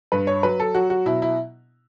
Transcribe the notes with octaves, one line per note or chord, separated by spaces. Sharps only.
G2 B4
C#5
F#3 B4
A4
F#3 F#4
F#4
B2 E4
E4